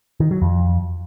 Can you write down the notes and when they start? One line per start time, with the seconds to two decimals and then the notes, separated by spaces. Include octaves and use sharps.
0.20 D#3
0.31 F#3
0.42 F2